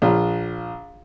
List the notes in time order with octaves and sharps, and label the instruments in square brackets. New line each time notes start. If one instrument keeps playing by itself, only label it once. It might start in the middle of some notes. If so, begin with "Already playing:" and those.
[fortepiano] A#1 F4